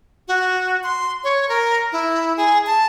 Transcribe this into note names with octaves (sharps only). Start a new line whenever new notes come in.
F#4
C6
C#5
A#4
E4
G#4
A5